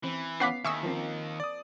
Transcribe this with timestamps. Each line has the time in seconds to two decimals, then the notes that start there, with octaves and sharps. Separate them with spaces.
0.03 E3 C4
0.40 B3 C#4 F5 F#5 D6 B6 C7
0.65 D#2 E5 G#5 C#6 D#6 E6
0.83 F3 A#3 C4
1.40 D5 D#6